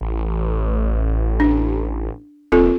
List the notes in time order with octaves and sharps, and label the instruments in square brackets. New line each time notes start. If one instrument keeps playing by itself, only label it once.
[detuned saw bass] A1
[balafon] D4
[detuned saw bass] D#1 [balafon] C4 F4 A4